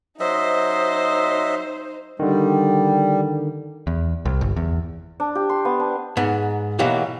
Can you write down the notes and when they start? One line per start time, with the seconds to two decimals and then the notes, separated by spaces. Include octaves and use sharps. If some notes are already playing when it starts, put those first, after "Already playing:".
0.20 F#3 D#4 C5 D#5 E5
2.19 D3 D#3 G3
3.87 E2
4.25 C2
4.41 G1
4.56 E2
5.20 D4
5.35 G4
5.49 C6
5.65 B3
5.80 D4
6.17 G#2 B3
6.79 B2 E3 F#3 A#3 G4